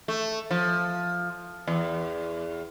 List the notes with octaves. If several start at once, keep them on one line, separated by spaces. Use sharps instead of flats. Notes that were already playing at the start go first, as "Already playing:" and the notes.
A3
F3
E2